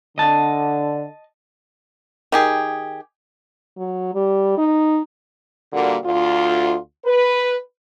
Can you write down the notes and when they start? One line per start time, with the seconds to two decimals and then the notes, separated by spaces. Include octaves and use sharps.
0.18 D3 D#5 A5
2.32 D#3 G4 G#4
3.78 F#3
4.14 G3
4.58 D#4
5.73 A#2 D3 G3 A#3 F#4
6.04 D2 F4
7.05 B4